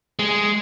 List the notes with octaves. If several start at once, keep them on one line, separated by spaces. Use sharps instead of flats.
G#3